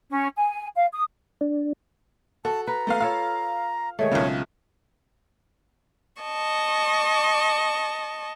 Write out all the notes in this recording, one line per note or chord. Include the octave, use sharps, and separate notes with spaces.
C#4
G#5
F5
D#6
D4
F#4 A4 A5
B4 A#5
A3 B3 F5
F4 A4 C#5 F5
D#3 G#3 A3 C#5
B1 C#3 C4 F4
D#5 A5 C#6